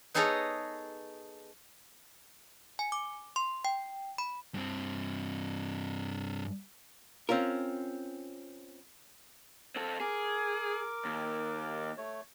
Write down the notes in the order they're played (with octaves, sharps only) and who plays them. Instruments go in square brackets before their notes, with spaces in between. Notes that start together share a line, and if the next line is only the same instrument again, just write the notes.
[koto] B3 D#4 G#4 A4 C#5 A#5
[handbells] G#5
D6
C6
G5
B5
[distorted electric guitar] G2 C4
[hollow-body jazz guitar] C4 C#4 F4 A#4
[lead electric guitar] C4 A4
[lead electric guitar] G#4 [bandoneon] A#4 D6
[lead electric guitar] D#2
[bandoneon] A3 C#5